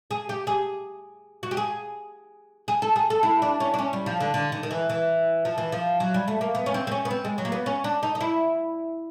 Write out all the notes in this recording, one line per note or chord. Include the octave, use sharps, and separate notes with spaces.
G#4
G4
G#4
F#4
G4
G#4
G#4
A4
G#4
A4
E4
D4
C#4
D4
C#4
G3
F3
D3
D3
D#3
D#3
E3
E3
F3
E3
F3
F#3
G3
A3
A#3
B3
C#4
C4
C4
C#4
B3
C4
G#3
F#3
A#3
B3
C#4
D4
D#4
D#4
E4